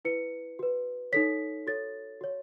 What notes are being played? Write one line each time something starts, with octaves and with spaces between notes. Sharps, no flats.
E4 B4 C#7
F#4 B4
D#4 A4 C#5 B6
F#4 A4 C#5 A6
F#4 C#5